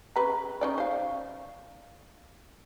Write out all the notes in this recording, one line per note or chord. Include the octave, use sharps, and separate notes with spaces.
C#3 B4 A#5
C#4 D#4 D5
C5 F5